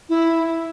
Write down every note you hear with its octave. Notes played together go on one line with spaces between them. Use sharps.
E4